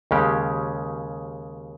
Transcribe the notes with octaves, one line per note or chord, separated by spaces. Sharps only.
D#2 C#3 G#3 C#4 G4